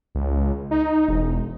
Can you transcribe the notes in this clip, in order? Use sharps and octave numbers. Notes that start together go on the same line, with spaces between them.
C#2
D#4
E1